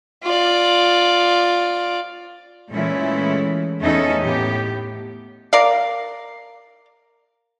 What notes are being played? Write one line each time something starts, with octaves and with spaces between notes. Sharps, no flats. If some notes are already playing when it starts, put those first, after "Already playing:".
F4 D5
A#2 E3 G#3 A3 C#4 E4
E2 A3 C#4 D#4 A4 D#5
A2 B3 G4
A#4 D5 F5